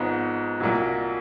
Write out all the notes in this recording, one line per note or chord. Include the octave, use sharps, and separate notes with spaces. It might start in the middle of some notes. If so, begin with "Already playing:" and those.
Already playing: G#1 G#2 F3 G#3 B3
C2 A#2 F#3